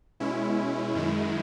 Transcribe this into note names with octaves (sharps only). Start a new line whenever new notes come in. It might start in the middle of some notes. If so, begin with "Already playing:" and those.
B2 G#3 C#4 E4
F#2 D#3 G#3